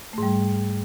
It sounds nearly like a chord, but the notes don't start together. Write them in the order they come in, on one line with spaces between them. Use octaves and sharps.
A3 G#2 G3